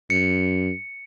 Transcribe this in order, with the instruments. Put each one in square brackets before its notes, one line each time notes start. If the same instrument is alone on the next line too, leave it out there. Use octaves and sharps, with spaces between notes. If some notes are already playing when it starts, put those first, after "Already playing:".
[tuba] F#2 [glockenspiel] C#7